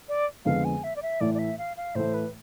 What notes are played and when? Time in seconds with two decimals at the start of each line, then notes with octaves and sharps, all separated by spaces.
0.09 D5
0.45 F2 D3 G#3 B3 F5
0.65 G#5
0.84 E5
0.96 D5
1.02 E5
1.20 A2 E3 A3 D5
1.34 D5
1.39 E5
1.58 F5
1.77 F5
1.95 A2 E3 A3 C5
2.14 B4